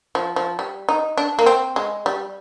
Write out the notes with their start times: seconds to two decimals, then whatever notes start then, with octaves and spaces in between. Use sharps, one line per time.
0.15 F3
0.36 F3
0.59 G3
0.89 D#4
1.17 D4
1.39 A#3
1.46 C4
1.76 G#3
2.06 G3